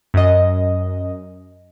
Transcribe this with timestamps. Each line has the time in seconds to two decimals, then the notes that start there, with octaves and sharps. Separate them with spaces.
0.14 F#2 D#5